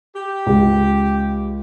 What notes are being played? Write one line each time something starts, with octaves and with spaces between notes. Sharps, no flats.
G4
C#2